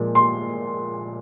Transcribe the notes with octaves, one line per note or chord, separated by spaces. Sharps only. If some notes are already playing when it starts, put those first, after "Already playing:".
Already playing: A#2 F3 G#3
C6